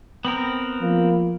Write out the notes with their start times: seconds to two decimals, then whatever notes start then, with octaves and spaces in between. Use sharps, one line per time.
0.25 B3 C4 A#4
0.81 F3 A#3